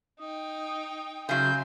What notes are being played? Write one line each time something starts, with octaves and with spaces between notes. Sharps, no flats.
D#4 G5 D#6
C#3 F#3 E5 C6 G6